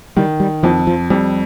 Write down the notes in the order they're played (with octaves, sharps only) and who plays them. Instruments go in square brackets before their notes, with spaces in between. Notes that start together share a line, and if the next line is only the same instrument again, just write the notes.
[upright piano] D#3 [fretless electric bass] G3
[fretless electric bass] G3
[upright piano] F2 [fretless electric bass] F3
[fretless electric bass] F3
[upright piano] F2 [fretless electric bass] G3